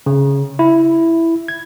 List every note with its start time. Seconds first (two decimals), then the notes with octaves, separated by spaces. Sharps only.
0.06 C#3
0.59 E4
1.48 G#6